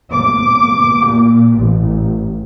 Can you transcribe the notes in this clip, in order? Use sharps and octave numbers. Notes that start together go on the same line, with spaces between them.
D6
A#2
A1